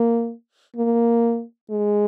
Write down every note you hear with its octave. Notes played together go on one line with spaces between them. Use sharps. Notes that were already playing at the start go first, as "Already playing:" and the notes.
Already playing: A#3
A#3
G#3